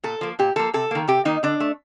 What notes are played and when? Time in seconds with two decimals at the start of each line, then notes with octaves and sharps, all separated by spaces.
0.04 A#2 A4
0.21 F3 A#3
0.39 A#2 G4
0.56 F3 A#3 A4
0.74 C3 A4
0.91 D#3 A#3
1.08 C3 G4
1.25 D#3 A#3 D#4
1.43 D3 D4
1.60 A3